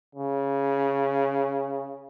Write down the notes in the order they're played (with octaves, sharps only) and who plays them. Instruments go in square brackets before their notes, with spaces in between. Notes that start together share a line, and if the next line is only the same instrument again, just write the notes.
[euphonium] C#3